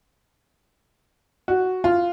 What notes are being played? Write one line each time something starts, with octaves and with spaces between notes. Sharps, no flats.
F#4
F4